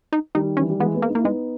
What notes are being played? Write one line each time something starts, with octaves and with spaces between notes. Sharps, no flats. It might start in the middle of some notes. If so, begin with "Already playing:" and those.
D#4
D#3 G3 D#4
E3 C#4
G3
E3 G#3 B3
G#3 B3
A#3
D#4
A#3 E4
G#3 B3 D#4